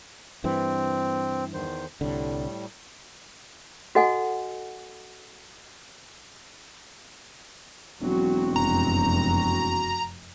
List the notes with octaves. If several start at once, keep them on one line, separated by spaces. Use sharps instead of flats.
G2 E3 C4
E2 D#3 C5
C2 A2 D3 G3
F#4 A4 D#5 F#5 G#5
E1 F#3 C4 F#4
F1 F#2 A#5